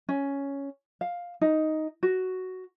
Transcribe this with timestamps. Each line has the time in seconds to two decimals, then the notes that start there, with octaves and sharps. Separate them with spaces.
0.09 C#4
1.01 F5
1.41 D#4
2.03 F#4